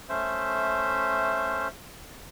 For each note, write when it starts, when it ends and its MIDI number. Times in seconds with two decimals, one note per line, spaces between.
0.09 1.68 57
0.09 1.68 61
0.09 1.68 72
0.09 1.68 76